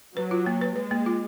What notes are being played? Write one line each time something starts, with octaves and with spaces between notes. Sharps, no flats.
F#3 B4
F4
A#3
B4
G#3 B4
A#3
F4